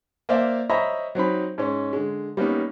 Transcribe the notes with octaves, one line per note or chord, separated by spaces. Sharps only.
A#3 C5 D5 E5 F5
C5 C#5 D#5 E5 A#5 B5
F#3 C4 D#4 B5
G#2 C#4
D3 G#3
G3 A#3 B3 C#4 D#4